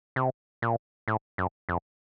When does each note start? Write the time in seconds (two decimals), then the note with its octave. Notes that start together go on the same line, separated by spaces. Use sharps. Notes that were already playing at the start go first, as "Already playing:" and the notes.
0.16 C3
0.62 A#2
1.08 A2
1.38 F#2
1.69 F2